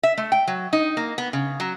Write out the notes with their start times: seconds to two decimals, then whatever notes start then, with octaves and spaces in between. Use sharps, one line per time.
0.03 E5
0.18 A3
0.32 G5
0.48 F#3
0.73 D#4
0.97 A#3
1.18 B3
1.33 C#3
1.60 F#3